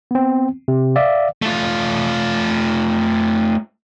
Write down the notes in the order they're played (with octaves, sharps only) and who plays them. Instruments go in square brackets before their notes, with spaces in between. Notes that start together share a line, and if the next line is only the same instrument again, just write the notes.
[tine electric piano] B3 C4
C3
D5 E5 F5
[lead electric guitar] A3 F4